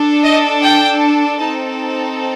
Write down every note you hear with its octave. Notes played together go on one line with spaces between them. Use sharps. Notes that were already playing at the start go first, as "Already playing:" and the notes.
Already playing: D4 A4
D#5
G5
C4 D#4 A4 A5